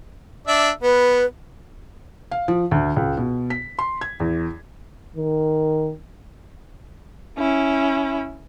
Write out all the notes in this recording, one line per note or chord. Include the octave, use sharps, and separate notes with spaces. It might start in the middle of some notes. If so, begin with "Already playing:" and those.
D4 D5 E5
B3 B4
F5
F3
D2
C#2
B2
B6
C6
G#6
E2
D#3
C#4 E4